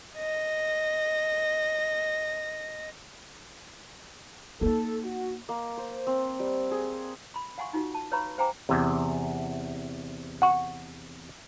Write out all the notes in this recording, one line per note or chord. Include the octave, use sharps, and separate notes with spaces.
D#5 A#6
A#3 D#4 A4
F#4
A#3
C5
C4
G3
G#4
B5 C6
F5 F#5 G#5 C6 C#6
D#4 F4 F#4
A5
B4 C#5 F5 A#5 B5 C#6
C5 F5 G5 G#5 A#5 D6
E2 C3
F#5 C#6